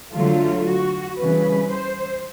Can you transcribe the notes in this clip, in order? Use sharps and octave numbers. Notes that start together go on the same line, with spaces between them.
D3 F#3 A3 F4
F#4
C#3 E3 G3 B4
C5